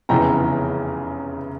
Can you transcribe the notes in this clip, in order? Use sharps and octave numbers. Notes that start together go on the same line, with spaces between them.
F1 E2 C#3 E3 G5 A#5